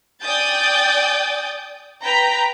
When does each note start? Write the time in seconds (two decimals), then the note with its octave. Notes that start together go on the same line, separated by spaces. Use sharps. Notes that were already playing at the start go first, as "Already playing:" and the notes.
0.23 D5 G5 G#5 D#6 G6 A6
2.02 B4 G5 A#5 G6 B6